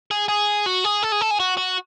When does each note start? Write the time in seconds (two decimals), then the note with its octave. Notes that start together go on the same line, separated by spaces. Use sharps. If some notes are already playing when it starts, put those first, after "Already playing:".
0.11 G#4
0.28 G#4
0.66 F#4
0.84 G#4
1.03 A4
1.12 G#4
1.21 A4
1.31 G#4
1.40 F#4
1.57 F#4